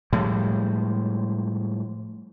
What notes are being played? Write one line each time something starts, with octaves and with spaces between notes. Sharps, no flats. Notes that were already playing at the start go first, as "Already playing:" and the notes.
A2 F3 G3 G#3